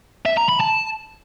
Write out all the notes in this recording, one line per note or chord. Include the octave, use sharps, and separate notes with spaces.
E5
A#5
B5
A5